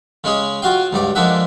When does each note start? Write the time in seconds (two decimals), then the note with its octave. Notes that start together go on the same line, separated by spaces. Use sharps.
0.24 C#3 G#3 C#4 G#4
0.62 F4 F#4 F5 G5
0.93 C#2 G2 D5
1.15 F2 G#3 A#3 D4 E5 F#5